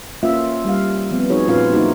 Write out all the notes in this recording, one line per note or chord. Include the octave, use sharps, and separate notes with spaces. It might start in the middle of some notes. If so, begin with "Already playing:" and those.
A#3 C#4 F4 E5
G3 F5
F3 B3 C4
F3 D#4 F#4 G#4 C#5
A#2 C#4 F4 B4 F5
F#3 A#3 D#4 E4 F#4